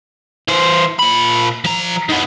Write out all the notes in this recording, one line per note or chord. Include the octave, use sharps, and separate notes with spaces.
E3 C5
A#2 B5
F3 A#5
D#3 B3